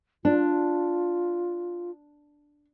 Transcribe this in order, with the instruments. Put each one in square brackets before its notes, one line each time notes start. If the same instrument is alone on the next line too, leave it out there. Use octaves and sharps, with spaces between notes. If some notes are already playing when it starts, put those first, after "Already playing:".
[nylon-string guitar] D4 [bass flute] F4